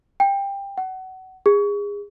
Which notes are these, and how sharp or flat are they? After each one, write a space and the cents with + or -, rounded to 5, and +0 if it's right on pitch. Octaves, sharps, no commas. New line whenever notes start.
G5 +20
F#5 +25
G#4 -30